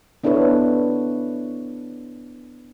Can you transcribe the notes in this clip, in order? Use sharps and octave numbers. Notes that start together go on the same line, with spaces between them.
B3 D4 E4 A4 B4 C#5